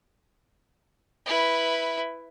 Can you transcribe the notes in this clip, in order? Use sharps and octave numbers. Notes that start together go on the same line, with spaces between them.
E4 B4